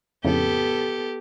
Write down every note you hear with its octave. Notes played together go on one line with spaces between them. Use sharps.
F2 A2 C#3 B3 G4 A4